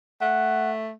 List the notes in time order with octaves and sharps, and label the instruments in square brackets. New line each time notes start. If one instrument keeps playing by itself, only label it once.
[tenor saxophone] A3 [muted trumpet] F#5